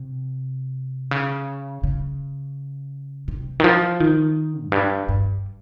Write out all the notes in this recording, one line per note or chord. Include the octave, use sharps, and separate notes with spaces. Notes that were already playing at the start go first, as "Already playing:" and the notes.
Already playing: C3
C#3
C#3
C3
D#3
F3
D#3
F2
G2
G2